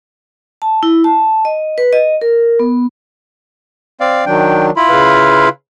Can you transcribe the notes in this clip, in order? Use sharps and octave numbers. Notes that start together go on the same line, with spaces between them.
A5
E4
A5
D#5
B4
D#5
A#4
B3
C4 D5 F5
D#3 F#3 D4 G5
E4 F4 B5
C#3 B4 F5